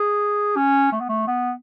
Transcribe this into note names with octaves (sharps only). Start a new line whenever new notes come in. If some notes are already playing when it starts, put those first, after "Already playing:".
Already playing: G#4
C#4
A3
B3
A3
B3